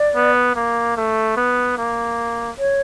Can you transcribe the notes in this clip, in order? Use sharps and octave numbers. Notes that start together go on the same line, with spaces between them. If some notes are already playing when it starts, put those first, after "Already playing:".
Already playing: D5
B3
A#3
A3
B3
A#3
C#5